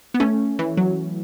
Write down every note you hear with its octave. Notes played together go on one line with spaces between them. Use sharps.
B3
A3 C#4
E3
F#3